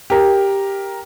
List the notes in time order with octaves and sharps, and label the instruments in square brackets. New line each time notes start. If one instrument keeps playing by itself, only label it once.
[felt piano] G4 A#4